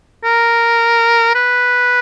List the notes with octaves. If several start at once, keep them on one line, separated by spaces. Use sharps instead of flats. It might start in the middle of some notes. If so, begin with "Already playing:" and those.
A#4
B4